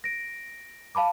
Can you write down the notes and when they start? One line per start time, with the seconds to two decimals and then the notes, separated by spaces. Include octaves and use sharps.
0.04 A#6 D7
0.95 F5 A5 B5 D6